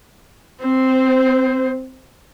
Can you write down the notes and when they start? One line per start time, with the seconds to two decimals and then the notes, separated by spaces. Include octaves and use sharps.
0.61 C4 C5